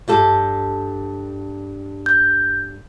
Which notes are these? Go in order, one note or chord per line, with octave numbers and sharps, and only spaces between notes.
G2 G4 A4
G6